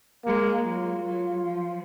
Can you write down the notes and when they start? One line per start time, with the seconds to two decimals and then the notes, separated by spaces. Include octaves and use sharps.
0.25 G#3 A#3
0.64 F#3 F4
1.05 F#3
1.44 F3